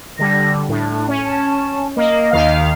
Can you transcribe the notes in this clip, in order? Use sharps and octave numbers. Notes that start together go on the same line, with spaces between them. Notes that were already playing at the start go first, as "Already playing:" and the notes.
D3 G3 A#6
A2 D4
C#4
A5
A#3 D#5
D#2 D#3 F5